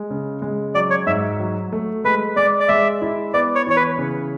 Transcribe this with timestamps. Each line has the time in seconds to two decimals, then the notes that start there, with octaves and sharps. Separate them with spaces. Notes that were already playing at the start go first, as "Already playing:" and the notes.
Already playing: G#3
0.10 C#3
0.42 G#3
0.75 F#3 D5
0.90 C#5
1.06 G#2 E5
1.40 F#3
1.72 A3
2.04 G#3 B4
2.36 G#3 D5
2.60 D5
2.68 G#3 E5
3.02 E4
3.34 B3 D5
3.55 C#5
3.67 E3 C#5
3.77 B4
3.98 C#3